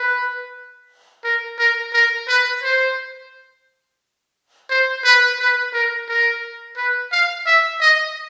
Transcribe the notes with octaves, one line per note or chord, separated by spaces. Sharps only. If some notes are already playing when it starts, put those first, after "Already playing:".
Already playing: B4
A#4
A#4
A#4
B4
C5
C5
B4
B4
A#4
A#4
B4
F5
E5
D#5